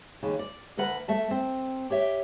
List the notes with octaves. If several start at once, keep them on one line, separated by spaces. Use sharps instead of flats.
D#2 C#3
D5
D2 A#4 B4 F#5
A3 E5 A5
C4
G4 C#5 E5